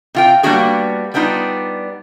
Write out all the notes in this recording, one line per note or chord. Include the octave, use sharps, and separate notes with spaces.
C3 F4 G5
G3 A#3 B3 D4 F#4 G#4
G3 B3 D4 D#4 F4